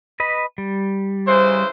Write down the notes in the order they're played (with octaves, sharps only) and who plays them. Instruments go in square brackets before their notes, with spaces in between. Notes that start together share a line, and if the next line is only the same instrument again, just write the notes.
[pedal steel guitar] B4 D#5 B5
G3
[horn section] C#3 E3 C5